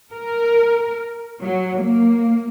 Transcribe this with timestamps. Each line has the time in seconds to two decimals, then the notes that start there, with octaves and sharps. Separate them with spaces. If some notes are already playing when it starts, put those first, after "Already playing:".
0.13 A#4
1.41 F#3
1.81 A#3